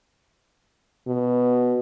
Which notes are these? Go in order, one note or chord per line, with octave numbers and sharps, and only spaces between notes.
B2